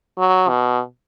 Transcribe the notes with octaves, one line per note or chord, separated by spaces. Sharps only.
F#3
B2